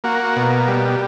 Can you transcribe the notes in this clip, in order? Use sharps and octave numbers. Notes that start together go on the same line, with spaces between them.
A#3 F#4
B2
G3